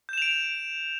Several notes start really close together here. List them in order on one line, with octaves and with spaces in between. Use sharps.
G6 E7 F7 D7